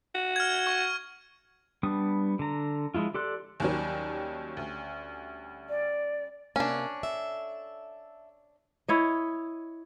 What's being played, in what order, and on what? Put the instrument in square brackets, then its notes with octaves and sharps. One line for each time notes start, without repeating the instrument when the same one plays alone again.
[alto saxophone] F#4
[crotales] F6 G#6
C#6
[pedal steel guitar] G3 B3 D4 D#6
D3 A#5
F3 G#3 E4 F4
G4 A4 D5 C6 F#6
[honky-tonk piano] D#2 D#3 F#3 [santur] G3 C#4
[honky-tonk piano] D2
[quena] D5
[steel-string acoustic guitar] C3 A#3 [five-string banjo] C#4 D4
[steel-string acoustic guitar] A4 E5
[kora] E4 C#5 D#5